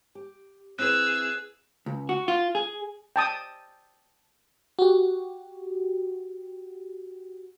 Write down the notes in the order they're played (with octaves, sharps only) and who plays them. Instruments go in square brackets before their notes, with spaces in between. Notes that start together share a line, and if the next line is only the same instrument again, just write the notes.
[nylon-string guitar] G4
[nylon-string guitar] C4 E4 B4 [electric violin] G#4 E6 [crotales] F#6
[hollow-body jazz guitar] C#2
F#4
F4
G#4
[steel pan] G5 A5 D#6
[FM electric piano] F#4 G4